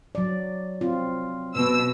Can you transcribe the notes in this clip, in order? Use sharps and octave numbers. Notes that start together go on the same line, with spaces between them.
F#3 D5
C4 F4
B2 E6